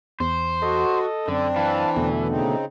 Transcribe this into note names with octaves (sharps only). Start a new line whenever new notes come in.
E2 C5
F#4 A4 D#5
F#2 D3 C4 D4
E3 F5 A5
E2 B2 D3 A3
C#3 C4 D#4